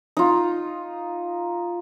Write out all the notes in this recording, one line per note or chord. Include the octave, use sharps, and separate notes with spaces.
D#4 F4